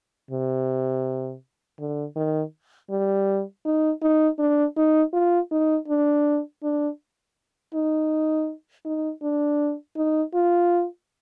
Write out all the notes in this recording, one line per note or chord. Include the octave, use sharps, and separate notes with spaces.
C3
D3
D#3
G3
D#4
D#4
D4
D#4
F4
D#4
D4
D4
D#4
D#4
D4
D#4
F4